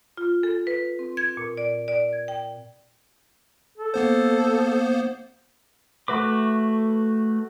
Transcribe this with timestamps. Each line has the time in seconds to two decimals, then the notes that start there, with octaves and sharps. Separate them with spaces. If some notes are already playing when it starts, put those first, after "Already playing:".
0.17 F4
0.43 A4
0.67 B4
0.99 C4
1.17 G#6
1.37 A#2
1.57 D5
1.88 D5
2.13 G#6
2.28 G5
3.78 A4
3.94 A#3 B3 C5
6.08 A3 F#4 B4 D6